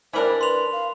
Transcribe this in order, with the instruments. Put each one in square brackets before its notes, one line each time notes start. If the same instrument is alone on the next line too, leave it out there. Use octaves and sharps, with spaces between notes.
[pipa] E3 G3 D4 [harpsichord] A#4 B5 [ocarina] C5
[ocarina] B4 [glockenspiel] C6 F7
[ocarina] F5